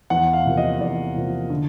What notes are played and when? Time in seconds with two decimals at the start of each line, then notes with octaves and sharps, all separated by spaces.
0.10 E2 F#5
0.33 F5
0.45 C3 F3 A#3
0.57 D#5
0.81 E2 D5
1.16 C3 F3 A#3
1.50 D3